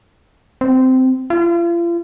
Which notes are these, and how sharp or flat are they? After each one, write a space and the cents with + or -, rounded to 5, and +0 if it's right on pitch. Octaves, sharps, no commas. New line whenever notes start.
C4 -15
F4 -40